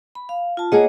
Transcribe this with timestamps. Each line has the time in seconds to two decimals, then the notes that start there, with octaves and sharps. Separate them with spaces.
0.15 B5
0.29 F5
0.57 F4 A5
0.72 A#3 G#4 C#5 D#5 F#5